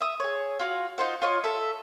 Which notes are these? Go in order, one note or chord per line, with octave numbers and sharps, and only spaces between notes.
E5 D#6
G#4 C#5
F4 F#4 F5
D#4 F4 C5 F#5
F4 C#5 D#5 C#6
A4 E5